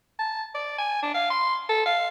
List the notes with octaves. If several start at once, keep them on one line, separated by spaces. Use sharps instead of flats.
A5
D5
G#5
D4
F5
C6
A4
F5